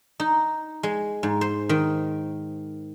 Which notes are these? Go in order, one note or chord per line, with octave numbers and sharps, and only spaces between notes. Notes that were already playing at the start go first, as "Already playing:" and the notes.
D#4
G#3
G#2
C5
D#3